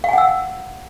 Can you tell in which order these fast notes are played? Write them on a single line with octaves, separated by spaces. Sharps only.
F5 G#5 F#5 E6